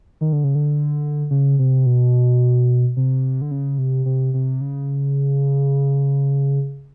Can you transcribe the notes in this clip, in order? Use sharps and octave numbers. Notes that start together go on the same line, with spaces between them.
D#3
D3
C#3
D3
C#3
C3
B2
C3
D3
C#3
C3
C3
C3
C#3